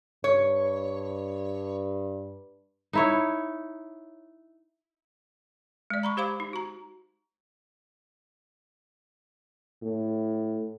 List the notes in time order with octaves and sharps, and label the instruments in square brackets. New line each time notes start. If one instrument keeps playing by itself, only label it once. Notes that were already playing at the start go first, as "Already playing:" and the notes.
[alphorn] G2 [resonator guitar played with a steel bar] C#5
[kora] D#4 E4 C#5
[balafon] G#3 D5
A#5 B5 C#6
G4 C5 F5 B5 D6
D#4
F#4 A#5
[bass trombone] A2